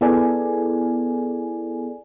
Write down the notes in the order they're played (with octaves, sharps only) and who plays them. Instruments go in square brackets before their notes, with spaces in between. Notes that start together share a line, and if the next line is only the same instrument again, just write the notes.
[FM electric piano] B3 E4 G#4 A4 D5 G#5